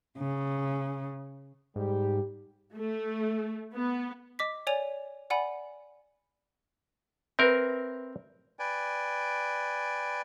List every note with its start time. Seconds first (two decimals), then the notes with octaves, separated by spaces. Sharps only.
0.18 C#3
1.76 G#2 G3 G4
2.75 A3
3.74 B3
4.39 D#5 D6 B6
4.67 C#5 D5 G#5 F7
5.30 D5 F#5 G#5 B5
7.39 C4 A#4 B4 E5
8.59 B4 D5 G5 G#5